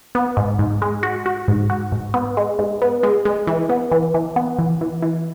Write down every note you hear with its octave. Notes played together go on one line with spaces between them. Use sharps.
B3
G#2
G#2
G#3
F#4
F#4
G#2
F#4
G#2
B3
G#3
G#2
B3
G#3
G#3
E3
B3
E3
E3
B3
E3
E3
E3